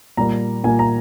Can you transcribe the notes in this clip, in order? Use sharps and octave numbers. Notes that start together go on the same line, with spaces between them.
A#2 G3 A#3 A#5
A#2 G3 A#3 G#5
A#5